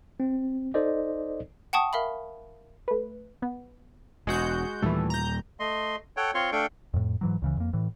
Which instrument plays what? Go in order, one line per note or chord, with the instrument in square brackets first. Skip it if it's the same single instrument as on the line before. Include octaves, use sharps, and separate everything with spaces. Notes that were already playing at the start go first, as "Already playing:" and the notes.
[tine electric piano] C4
D#4 A4 C5 D5 D#5
[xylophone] F#5 G5 A5 C#6 D#6
A#4 E5 F5 B5
[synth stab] A3 B4
B3
[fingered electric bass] E1 [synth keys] G#3 F#4 G6
[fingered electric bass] D#2 A#2 G3 [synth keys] E3 A3
[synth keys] A#5 G6
[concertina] A3 D#5 C6
A4 C#5 F#5 G5
C4 F4 C#5 C6 C#6
A3 D4 A4 F5 G5 C#6
[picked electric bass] F2 A2
G#2 E3 F#3
C#2 C#3 E3
F2 A#3
A2 E3